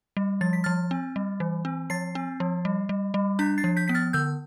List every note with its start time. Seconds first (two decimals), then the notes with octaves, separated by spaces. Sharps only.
0.17 G3
0.41 F3 A6
0.53 B6
0.64 F3 F6 A6
0.91 C4
1.16 G3
1.40 E3
1.65 C4
1.90 F3 A6 C7
2.15 C4
2.40 F3
2.65 G3
2.89 G3
3.14 G3
3.39 D4 G6 B6
3.58 A6 C7
3.64 F3
3.77 G6 B6
3.88 B3 B6
3.95 F6 A6
4.13 D3 E6 G6